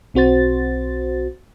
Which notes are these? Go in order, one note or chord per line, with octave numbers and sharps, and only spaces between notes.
B1 C4 F#4 C5 A6